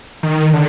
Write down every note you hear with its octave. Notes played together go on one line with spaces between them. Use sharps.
D#3
D3